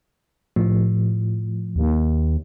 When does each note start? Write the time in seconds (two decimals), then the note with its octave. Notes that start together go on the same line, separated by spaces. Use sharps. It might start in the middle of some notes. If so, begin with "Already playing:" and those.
0.56 A2 F3
1.76 D#2